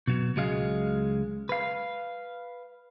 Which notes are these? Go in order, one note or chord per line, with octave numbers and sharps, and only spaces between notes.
B2 F#3
C#2 F#3 G#3 F5
B4 F5